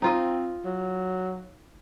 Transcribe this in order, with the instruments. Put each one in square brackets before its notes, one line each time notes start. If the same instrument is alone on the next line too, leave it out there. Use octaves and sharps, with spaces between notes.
[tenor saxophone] C4 [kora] D#4 F4 D#5
[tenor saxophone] F#3